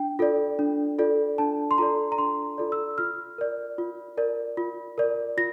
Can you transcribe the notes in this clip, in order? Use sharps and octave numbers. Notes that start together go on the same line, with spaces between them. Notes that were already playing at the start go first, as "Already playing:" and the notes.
Already playing: D4 G5
F4 A4 D5
D4
F4 A4 D5
D4 A5
C6
F4 A4 D5 A#5
A#5
D4 C6
F4 A4 D5
E6
F4 F6
A#4 D5
F4
A#4 D5
F4
A#4 D5
F4 A#6